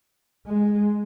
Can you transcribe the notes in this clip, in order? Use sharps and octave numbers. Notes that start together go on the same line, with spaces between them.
G#3